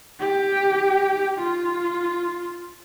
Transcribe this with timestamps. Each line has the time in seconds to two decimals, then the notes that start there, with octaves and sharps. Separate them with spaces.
0.19 G4
1.38 F4